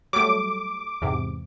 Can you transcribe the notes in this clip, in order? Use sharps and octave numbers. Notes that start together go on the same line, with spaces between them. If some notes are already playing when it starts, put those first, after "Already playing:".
F#3 G3 A3 D6
E2 G#2 C3